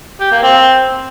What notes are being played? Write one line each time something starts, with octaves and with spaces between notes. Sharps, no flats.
G4
A#3
C4